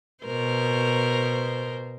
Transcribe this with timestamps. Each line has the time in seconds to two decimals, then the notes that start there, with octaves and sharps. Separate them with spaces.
0.24 B2 A#4 C5